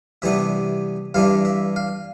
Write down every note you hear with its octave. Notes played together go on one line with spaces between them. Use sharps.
C3 E3 G3 B3 D4 E5
G2 E3 G3 D4 F5
E5
F5